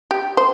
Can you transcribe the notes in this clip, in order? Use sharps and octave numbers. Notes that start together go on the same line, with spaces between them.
G4
C5